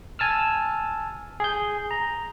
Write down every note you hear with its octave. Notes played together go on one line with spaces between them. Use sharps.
G#5 A5 E6 F6
G#4 G6
A#5